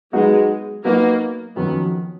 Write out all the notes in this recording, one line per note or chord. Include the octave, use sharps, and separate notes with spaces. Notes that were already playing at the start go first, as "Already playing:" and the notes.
F#3 G#3 B3 D#4 F#4
F#3 A#3 B3 D#4 F#4
F2 D#3 F#3 B3 C#4